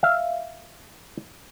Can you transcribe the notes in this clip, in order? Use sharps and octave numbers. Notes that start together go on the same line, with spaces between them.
E5 F5